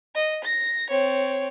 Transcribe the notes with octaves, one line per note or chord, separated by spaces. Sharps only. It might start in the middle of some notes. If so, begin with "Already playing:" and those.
D#5
A#6
C4 C#5